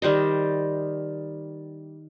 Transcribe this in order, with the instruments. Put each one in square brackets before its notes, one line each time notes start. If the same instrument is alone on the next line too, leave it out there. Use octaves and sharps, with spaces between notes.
[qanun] D#3 G3 C5 D#5